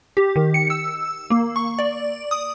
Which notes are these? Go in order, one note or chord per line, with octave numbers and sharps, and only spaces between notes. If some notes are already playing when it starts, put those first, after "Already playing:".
G4
D#3
C#7
E6
A#3
C#6
D5
D#6